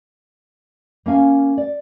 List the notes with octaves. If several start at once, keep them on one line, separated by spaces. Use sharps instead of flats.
A#3 C#4 F5 G#5
D5